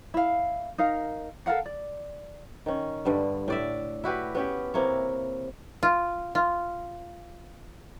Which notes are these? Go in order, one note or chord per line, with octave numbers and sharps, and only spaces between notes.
E4 F5
D#4 A#4 F5
A4 A#4 F5 F#5
D5
D#3 C#4
G2 D3 G3
A2 D5 E5
E4 F#4 G4 B4
B3 C#4 G4
C3 A#3 E4 C#5
F4
F4